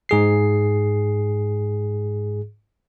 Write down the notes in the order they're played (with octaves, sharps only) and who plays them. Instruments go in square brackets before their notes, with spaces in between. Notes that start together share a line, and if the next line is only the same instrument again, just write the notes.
[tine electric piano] G#2 G#4 C7